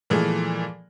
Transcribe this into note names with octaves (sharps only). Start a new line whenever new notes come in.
A#2 E3 F3 G#3 A3